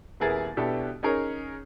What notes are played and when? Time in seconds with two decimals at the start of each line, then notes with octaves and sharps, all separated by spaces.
0.20 D#1 B3 E4 G#4 A#4 A6
0.57 B2 B3 D4 E4 G4 A4
1.03 C#4 D#4 G#4 A#4 C#5